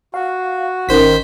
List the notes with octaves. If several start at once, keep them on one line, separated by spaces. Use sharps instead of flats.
F#4 F5
G#1 D#3 C#4 C5 B6